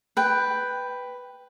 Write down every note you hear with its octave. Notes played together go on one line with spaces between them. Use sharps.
B4 G5